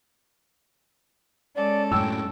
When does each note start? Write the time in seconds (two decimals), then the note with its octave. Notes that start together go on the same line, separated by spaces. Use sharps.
1.55 G#3 C#4 A4 D5
1.92 F#2 A2 G5 E6